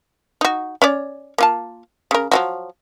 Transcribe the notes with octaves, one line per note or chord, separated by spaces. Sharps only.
D#4 F#4
C#4 C#5 D5
A#3 F4 A5
C#3 A#4
F3 F#3 F#4